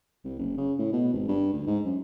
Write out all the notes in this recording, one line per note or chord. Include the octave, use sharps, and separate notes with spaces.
C2
F#1
C#3
A2
B2
G#1
G2
D2
G#2
F#2